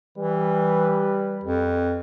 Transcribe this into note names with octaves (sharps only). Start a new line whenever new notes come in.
E3 G3 B4
F2